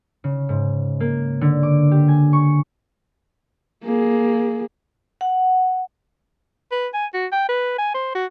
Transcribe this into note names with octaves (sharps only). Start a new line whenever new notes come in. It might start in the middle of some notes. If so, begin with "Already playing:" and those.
C#3
G#2
A#3
D3
D6
G4
G#5
C#6
A#3 G#4
F#5
B4
G#5
F#4
G5
B4
G#5
C5
F#4